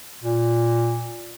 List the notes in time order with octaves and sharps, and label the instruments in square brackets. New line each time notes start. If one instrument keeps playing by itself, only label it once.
[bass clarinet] A#2